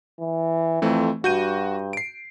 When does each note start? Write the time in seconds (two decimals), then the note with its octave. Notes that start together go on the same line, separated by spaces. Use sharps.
0.20 E3
0.82 F2 E3 A3 C4
1.24 G2 F#4 G6 D#7
1.93 C7 D7